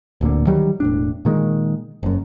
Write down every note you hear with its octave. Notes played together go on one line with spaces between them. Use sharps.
D1 D2 A#2 D3
D#3 F#3 G3
E1 A2 D4
A#2 D#3 G#3
F#1 F#2